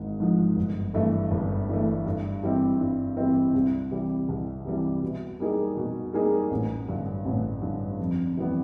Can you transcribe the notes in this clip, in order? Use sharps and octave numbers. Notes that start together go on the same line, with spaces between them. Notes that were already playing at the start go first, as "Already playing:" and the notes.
Already playing: G#1 G#2
G#2 F3
G1
G2 E3 A3
G1
G2 E3 A3
G2
E3 G3 C4 E4
G2
E3 G3 C4 E4
C2
C3 E3 G3
C2
C3 E3 G3
B2
G3 A#3 D#4 G#4
B2
G3 A#3 D#4 G#4
A1
G2 D3
A1
G2 D3
F2
C3 E3 G3 B3